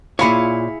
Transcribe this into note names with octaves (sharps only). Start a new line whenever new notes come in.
A#2 E4 F4 G#4 C#5 F5 B5 C#7